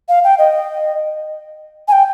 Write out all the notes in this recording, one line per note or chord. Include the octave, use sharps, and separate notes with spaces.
F5
G5
D#5
G#5
G5